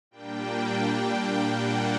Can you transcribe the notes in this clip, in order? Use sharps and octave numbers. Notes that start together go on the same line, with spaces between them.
A#2 G3 A#3 D4 G5
F#5